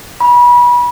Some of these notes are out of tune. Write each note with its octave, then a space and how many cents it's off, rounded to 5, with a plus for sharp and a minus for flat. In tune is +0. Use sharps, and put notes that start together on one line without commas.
B5 -30